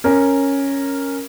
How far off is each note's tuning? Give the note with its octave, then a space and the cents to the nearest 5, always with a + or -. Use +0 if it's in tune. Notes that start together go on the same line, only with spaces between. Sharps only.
C#4 -5 A#4 +0